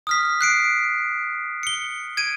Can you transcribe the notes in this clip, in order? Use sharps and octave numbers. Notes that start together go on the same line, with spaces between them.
D#6 F6 B6
F#6 C7 D7
C#7 G7
G#6 D7 D#7